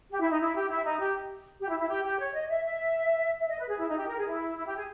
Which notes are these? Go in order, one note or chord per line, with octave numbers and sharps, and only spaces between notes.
G4
E4
D#4
E4
G4
E4
D#4
G4
G4
E4
E4
G4
G4
C#5
D#5
E5
E5
E5
D#5
B4
G#4
E4
D#4
G4
A#4
G#4
E4
E4
G4
G#4